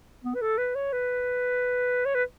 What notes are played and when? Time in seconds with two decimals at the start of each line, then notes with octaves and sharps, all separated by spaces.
0.25 B3
0.35 B4
0.42 A4
0.58 B4
0.75 C#5
0.93 B4
2.06 C#5
2.15 B4